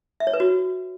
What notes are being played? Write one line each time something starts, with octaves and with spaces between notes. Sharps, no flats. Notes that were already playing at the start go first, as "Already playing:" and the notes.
E5
C#5
B4
F#4